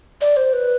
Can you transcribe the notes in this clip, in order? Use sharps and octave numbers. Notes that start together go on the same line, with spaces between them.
D5
C5
B4